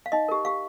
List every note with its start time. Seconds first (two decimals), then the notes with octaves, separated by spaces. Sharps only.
0.06 F5
0.12 D#4 D#5
0.28 G4 A#4
0.45 G4 F5